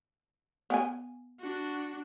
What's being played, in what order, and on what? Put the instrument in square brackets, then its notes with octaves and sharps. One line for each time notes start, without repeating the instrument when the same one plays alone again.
[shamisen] B3 G5 G#5
[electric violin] D4 F#4